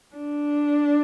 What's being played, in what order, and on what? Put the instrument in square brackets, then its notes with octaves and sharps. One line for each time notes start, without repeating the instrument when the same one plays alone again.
[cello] D4